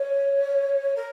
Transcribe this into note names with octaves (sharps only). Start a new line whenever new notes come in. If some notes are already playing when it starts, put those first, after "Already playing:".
Already playing: C#5
A#4